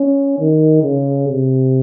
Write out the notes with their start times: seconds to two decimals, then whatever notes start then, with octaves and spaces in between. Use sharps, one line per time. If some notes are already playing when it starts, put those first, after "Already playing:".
Already playing: C#4
0.39 D#3
0.83 C#3
1.28 C3